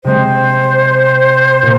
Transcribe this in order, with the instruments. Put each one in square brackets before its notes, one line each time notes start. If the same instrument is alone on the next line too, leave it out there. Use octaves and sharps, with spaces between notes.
[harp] C3 G#3 C4 [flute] C5
[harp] A#2 A#3